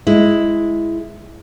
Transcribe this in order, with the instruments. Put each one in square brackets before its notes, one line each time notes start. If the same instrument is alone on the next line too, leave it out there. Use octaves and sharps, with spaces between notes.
[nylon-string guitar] G#3 E4